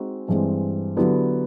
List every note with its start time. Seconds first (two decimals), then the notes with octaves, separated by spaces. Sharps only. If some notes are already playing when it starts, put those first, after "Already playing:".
Already playing: G#3 C4 D#4 F#4
0.28 G2 E3 G#3 C4
0.97 D3 F#3 B3 E4 G4